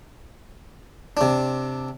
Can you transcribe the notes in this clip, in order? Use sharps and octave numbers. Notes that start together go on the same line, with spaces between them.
C3 D4